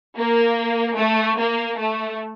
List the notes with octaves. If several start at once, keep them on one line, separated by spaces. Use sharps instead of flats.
A#3
A3
A#3
A3